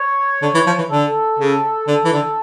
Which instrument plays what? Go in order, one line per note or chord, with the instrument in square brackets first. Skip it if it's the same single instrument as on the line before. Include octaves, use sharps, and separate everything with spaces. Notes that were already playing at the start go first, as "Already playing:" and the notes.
Already playing: [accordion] C#5
[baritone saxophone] D3
E3
F3
E3
[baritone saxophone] D3 [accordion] A4
[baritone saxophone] C#3
D3
E3
D3